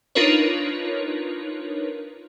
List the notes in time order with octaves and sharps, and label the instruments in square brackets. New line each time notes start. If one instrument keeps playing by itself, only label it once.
[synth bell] D4 D#4 F4 A#4 B4 C#5